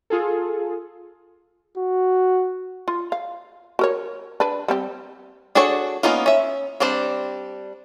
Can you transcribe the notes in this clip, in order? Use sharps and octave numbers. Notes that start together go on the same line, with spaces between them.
F4 G#4 A4
F#4
F4
F5
F#4 A#4 C#5
D4 B4
G3 C4 G4
D4 F#4 G#4 A4 C#5
A#3 B3 C#4 D#4 F4
C#4 E5
G3 C4 D4 C5